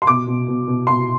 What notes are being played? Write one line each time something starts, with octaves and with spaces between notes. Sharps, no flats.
C6
B2 D6
B2
B2
B2
B2 C6